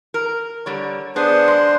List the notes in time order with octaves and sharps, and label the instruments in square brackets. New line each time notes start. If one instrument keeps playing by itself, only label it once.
[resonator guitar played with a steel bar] A#4
D3 G3 C#5
[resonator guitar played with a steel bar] B3 G#4 [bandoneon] D4 C5
[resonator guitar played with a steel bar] G#3